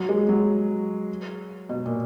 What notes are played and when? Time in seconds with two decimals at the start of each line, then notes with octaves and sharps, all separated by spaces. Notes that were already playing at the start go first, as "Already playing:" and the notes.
Already playing: F#3
0.09 G#3
0.29 F#3
1.69 B2
1.86 A#2